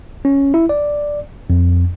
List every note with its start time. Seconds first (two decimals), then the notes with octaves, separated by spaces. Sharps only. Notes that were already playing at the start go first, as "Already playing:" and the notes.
0.25 C#4
0.54 E4
0.69 D5
1.50 F2